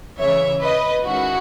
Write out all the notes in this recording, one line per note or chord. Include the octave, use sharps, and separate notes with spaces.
C#3 E3 G#3 C#5 E5
B4 D#5
D#3 G#3 C#4 E4 F#4